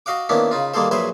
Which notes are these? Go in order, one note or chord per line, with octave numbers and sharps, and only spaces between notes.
F#4 D#5 F5 F#5 D6
D#3 A#3 B3 C#4 D4 E4
C#3 D#4 F4
D#3 G3 A#3 G#4 A4 C5
A#1 F#3 G#4 B4 C5 E5